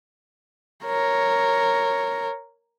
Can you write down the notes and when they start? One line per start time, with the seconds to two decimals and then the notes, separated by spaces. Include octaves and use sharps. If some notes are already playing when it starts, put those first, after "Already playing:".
0.85 A#4 C#5